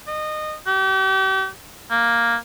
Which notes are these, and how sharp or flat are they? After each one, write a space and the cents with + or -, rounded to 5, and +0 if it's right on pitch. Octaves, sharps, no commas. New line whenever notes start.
D#5 -20
G4 -40
A#3 +5